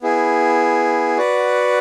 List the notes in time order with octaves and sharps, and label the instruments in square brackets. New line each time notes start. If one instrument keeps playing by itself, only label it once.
[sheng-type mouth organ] B3 E4 G#4
F#4 B4 D5 F#5